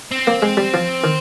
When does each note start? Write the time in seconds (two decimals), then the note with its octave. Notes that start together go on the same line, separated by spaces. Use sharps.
0.12 C4
0.27 A#3
0.42 G#3
0.57 G3
0.74 F3
1.04 D#3